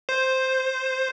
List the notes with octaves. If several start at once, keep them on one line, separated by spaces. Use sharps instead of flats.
C5